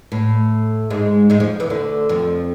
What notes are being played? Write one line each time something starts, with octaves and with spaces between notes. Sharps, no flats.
A2
G#2 G#3
G#2 G#3
F2 F3
E2 E3
D2 D3
F2 F3